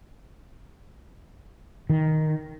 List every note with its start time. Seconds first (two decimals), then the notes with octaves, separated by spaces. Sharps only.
1.90 D#3